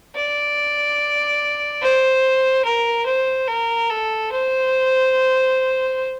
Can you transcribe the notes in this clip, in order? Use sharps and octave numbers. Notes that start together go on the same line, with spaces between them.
D5
C5
A#4
C5
A#4
A4
C5